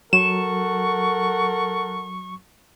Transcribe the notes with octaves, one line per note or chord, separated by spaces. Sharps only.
F#3 A4 A#4 F#5 C#6 E7